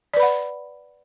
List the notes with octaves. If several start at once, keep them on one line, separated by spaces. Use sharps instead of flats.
B4 D5 F#5 B5